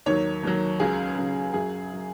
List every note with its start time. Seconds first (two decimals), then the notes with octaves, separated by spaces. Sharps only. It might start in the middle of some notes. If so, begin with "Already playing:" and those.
0.06 D#2 D#3 F#3 C#5
0.43 D#2 D#3 F#3
0.80 C#2 C#3 F#3 G#4
1.17 C#2 C#3 F#3
1.53 F#2 F#3 G#4
1.93 F#3